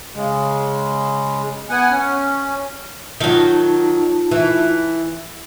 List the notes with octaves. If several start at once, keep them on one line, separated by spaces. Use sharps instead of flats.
C#3 G#3
B3 F#5 G#5
C#4
D#3 F#3 D#4 F4 A5
E3